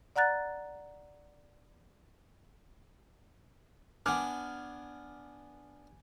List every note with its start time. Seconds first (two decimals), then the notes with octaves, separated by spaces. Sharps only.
0.16 D5 F#5 A#5 F#6 A6
4.06 B3 D4 G#5 D6 F6